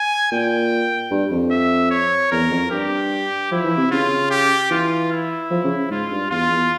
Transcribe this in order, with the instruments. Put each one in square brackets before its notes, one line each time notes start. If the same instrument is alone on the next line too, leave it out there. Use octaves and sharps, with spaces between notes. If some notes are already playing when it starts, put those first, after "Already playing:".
Already playing: [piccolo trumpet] G#5
[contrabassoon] A#2 [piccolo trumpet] G5
[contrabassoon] G2
F2
[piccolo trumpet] E5
C#5
[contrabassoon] E2 [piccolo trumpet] A#4
[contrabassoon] F2
[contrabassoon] G2 [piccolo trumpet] G4
[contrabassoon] F3 [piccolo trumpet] E4
[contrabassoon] E3
C3
[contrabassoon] C#3 [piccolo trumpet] F4
[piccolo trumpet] G4
[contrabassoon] E3 [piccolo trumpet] F4
[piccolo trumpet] E4
[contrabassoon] F3
C#3
[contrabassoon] G#2 [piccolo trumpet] F4
[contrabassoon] G2
[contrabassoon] E2 [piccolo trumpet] F4
[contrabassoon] E2